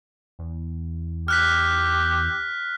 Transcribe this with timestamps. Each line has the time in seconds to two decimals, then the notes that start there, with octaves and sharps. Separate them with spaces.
0.39 E2
1.28 G4 F6 F#6 B6